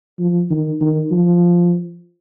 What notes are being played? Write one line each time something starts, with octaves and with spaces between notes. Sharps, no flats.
F3
D#3
D#3
F3